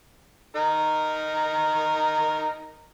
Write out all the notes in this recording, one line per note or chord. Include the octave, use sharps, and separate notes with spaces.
D#4 A#4